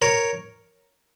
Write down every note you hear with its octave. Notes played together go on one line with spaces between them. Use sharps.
A#4 C#5